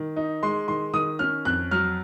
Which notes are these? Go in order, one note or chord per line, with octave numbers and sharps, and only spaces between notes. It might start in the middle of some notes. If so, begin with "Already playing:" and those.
Already playing: D#3
D#4
G#3 C6
D#3 C6
D#3 D#6
C#4 F6
F2 F#6
F#3 F6